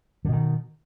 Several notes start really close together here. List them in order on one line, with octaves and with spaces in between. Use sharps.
D3 B2 D#3